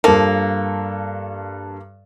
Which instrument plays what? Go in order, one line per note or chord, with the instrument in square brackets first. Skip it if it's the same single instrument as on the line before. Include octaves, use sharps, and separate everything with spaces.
[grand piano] G2 A4 [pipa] F3 A#3